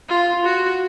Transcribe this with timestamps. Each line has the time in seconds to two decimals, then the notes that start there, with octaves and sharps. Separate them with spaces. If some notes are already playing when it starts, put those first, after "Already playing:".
0.09 F4
0.44 F#4